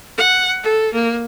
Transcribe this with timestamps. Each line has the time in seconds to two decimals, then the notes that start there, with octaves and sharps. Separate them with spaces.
0.18 F#5
0.63 A4
0.94 A#3